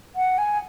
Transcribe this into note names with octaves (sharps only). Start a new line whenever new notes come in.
F#5
G#5